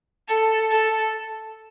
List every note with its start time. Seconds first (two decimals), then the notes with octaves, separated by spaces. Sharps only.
0.28 A4
0.71 A4